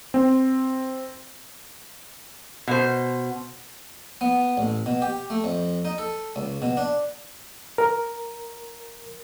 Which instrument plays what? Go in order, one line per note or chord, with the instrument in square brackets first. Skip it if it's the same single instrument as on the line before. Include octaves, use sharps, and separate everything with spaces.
[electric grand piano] C4
[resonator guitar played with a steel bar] B2 C5
[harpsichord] B3
A1
B2
G4
A3
F2
D#4
A4
C#2
B2
D4
[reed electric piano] A#4